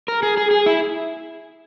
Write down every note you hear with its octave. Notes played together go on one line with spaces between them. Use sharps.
A#4
G#4
G#4
G#4
E4